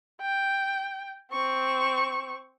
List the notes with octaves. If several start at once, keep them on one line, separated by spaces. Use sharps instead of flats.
G5
C4 C#6